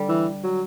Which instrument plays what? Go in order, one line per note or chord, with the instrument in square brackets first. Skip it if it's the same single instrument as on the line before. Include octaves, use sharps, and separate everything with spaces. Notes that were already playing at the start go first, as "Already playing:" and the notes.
Already playing: [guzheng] D3 G3
[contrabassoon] E3
F#3